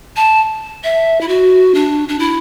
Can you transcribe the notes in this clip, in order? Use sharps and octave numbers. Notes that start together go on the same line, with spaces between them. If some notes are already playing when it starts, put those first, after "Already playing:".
A5
E5
E4
F#4
D4
D4
E4